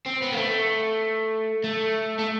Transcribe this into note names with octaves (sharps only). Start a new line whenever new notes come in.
C4
B3
A#3
A3
A3
A3